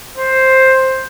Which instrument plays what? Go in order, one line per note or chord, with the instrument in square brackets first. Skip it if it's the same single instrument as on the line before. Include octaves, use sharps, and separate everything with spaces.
[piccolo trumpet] C5